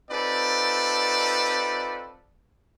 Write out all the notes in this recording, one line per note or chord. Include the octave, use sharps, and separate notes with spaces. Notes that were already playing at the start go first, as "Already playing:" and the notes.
C4 D#4 F4 A4 B4 D5